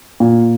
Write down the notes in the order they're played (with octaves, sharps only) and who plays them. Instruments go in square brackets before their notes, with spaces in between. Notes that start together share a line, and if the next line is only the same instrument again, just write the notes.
[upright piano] A#2